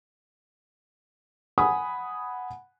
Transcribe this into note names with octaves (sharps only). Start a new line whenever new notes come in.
F#5 G#5 B5 D#6